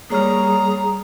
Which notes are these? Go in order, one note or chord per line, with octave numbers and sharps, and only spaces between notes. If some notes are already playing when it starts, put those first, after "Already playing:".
G3 A#3 G#4 C#5 A#5 F6